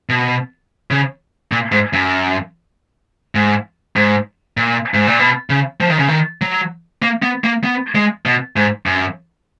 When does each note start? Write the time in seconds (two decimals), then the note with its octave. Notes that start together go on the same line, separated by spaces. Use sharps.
0.09 B2
0.91 C#3
1.52 A#2
1.72 G#2
1.93 F#2
3.35 G#2
3.96 G#2
4.57 A#2
4.94 G#2
5.07 A#2
5.19 B2
5.50 C#3
5.80 F3
5.90 D#3
5.99 C#3
6.08 D#3
6.41 F#3
7.02 A#3
7.22 B3
7.44 A#3
7.64 B3
7.95 G#3
8.25 B2
8.56 G#2
8.86 F#2